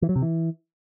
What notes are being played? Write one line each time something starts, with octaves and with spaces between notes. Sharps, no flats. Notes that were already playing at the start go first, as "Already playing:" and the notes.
E3
F#3
C3
E3